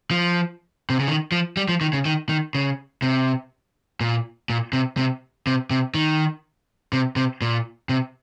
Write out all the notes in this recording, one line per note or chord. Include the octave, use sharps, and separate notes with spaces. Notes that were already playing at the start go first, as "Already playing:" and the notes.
F3
C3
C#3
D#3
F3
G3
F3
D#3
C#3
D#3
D#3
C#3
C3
A#2
A#2
C3
C3
C3
C3
D#3
C3
C3
A#2
C3